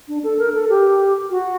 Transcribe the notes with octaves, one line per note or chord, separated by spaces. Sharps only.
D4
A4
A#4
A4
G4
F#4